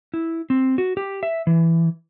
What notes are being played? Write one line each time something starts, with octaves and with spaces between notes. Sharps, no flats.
E4
C4
F#4
G4
E5
E3